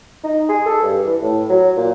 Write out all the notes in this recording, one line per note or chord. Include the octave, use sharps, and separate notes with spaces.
D#4
G#4
A4
G2
E3
A2
F#3
A#2